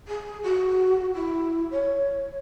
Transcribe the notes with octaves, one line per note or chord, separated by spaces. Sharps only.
G#4
F#4
E4
C#5